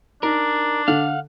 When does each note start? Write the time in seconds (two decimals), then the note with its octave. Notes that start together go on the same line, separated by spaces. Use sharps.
0.23 D4 D#4 A#4
0.88 D3 F5 F#5